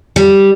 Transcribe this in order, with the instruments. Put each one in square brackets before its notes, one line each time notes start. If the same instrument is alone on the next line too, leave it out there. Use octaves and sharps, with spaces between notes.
[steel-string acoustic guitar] G3